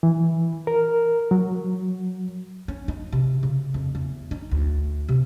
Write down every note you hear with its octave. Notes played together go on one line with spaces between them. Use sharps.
E3
A#4
F#3
C#4
D#4
C3
C#3
F2
E2
D#4
D2
C3